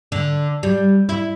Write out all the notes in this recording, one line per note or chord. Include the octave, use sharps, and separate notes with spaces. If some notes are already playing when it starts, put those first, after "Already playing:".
D3
G3
E4